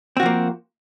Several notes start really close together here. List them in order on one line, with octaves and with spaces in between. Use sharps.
C4 F#4 F3 A#3